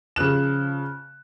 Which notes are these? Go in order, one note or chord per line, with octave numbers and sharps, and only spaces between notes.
C#3 F3 F#6 E7